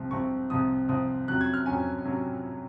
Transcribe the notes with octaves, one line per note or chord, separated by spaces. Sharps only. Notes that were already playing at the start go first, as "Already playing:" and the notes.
Already playing: C2 C3 F3 C4
C2 C3 F3 C4 C#6
C2 C3 F3 C4 D#6
C2 C3 F3 C4 D#6
F2 C3 F#3 C#4 F#6
G#6
F6
F2 C3 F#3 C#4 G#5
C3 F#3 C#4